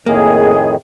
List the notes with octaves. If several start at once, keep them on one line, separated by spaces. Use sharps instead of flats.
F2 A2 D#3 A#3 G#4